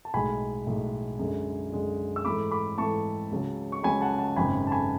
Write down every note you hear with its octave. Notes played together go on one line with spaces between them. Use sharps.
A5
B1 A2 G#3 G#5 B5
B1 A2 G#3
F#2 D3 G#3
F#2 D3 G#3
E6
G#2 E3 A3 B5 D6
B5 D6
G#2 E3 A3 A5 C#6
C#2 C#3 F#3
C#6
C#2 C#3 F#3 G#5 B5
F#5 A5
F#5 A5
G#1 F#2 C#3 G#5 B5
A5
G#5 B5